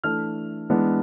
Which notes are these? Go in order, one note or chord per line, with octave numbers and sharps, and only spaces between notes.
E3 A3 D4 F6
E3 G#3 B3 D4